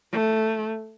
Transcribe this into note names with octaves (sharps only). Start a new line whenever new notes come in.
A3